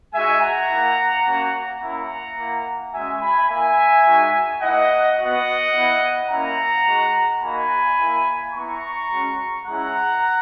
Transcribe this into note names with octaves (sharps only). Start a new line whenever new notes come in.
G#3 D#4 F#4 E5 G#5
F#5 A#5
A#3 E4
A#3 C#4 F#4
A#3 C#4 E4 F#5 A#5
A#3 E4
G#3 C#4 F#4 E5 G#5
G#5 B5
A#3 E4 E5 G#5
G#3 D#4 F#4
A#3 E4 D#5 F#5
B3 F#4 D#5 F#5
B3 E4
A#3 C#4 E4 F#5 A#5
G#3 D#4 F#4
A#3 D#4 F#4 G#5 B5
A#3 E4
B3 E4 A#5 C#6
G#3 C#4 F#4
G#3 C#4 E4 F#5 A#5